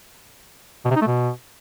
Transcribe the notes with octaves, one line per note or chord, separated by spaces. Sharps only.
B2
C3
D#4
A3
B2